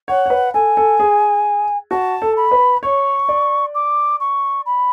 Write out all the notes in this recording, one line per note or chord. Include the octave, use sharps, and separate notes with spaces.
C#5 F#5
C#5
B4
A4 G#5
A4
G#4
F#4 A5
A4
B5
B4
C#5 C#6
D5
D6
C#6
B5